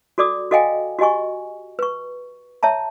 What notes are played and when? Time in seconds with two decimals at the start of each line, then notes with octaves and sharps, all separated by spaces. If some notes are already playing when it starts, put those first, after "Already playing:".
0.18 F#4 A4 D5 D6 D#6
0.51 F#4 A4 D#5 F5 G5 G#5
0.99 F#4 G4 D#5 G#5 C#6
1.79 B4 C#6
2.63 C#5 E5 A5 A#5